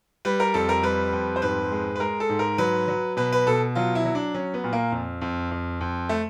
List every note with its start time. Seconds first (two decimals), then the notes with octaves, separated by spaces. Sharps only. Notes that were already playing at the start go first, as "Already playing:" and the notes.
0.25 G3 B4
0.40 A#4
0.54 F2 A4
0.69 A#4
0.83 G3 B4
1.13 F2
1.36 C5
1.42 G#2 B4
1.71 G#3
1.96 B4
2.00 G#3 A#4
2.20 A4
2.29 G#2
2.39 A#4
2.58 F#3 B4
2.88 F#3
3.17 B2 B4
3.32 B4
3.47 B2 A4
3.75 F#3 F4
3.95 E4
4.05 F#3
4.15 D4
4.34 F#3 C#4
4.54 B3
4.64 A#2
4.73 A#3
4.92 F2
5.21 F2
5.51 F2
5.80 F2
6.09 A3